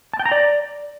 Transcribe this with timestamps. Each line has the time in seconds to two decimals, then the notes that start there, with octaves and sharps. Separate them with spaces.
0.13 A5
0.20 G5
0.26 A#5
0.32 D5